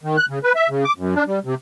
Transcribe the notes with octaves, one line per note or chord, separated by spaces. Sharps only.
D#3
F#6
C#3
B4
E5
C#3
D6
F#2
D4
G3
C3